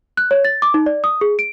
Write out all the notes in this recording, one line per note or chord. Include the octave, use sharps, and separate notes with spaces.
F#6
C#5
A6
D6
D#4
D5
D#6
G#4
D7